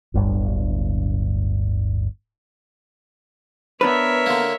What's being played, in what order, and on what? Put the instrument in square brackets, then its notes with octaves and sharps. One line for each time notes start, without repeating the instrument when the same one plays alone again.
[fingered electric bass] D1 G1 G2
[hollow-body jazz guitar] B3 D4 B4 [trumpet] A#4 [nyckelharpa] C#5 E5
[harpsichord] D3 A#3